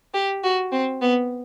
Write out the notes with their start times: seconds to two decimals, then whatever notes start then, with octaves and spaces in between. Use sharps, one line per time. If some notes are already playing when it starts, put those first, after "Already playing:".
0.14 G4
0.44 F#4
0.72 C4
1.02 B3